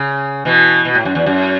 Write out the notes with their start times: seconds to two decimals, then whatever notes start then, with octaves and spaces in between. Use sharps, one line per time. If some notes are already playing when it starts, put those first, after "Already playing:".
Already playing: C#3
0.45 B2 E3
0.85 B2
0.95 A2
1.05 F#2
1.15 E2
1.26 F#2